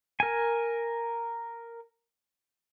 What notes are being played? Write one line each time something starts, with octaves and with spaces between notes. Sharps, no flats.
A#4 G#5